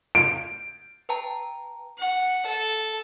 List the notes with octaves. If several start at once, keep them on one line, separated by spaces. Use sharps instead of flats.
D7
B4 G5 A5 A#5
F#5
A4